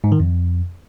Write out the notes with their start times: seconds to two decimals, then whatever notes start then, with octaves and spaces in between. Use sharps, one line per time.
0.04 G#2
0.12 D#3
0.20 F2